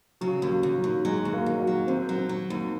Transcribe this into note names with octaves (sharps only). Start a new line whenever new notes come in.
C#3 F#3
D#2
F#3
D#2
F#3
D#2
F#3 G#3
D#2
A#3
D#2
F#4
F#3
D#2 C4
F#3
C4
F#3
D#2